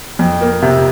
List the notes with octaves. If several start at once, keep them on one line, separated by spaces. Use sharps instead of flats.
F2
A#3
C3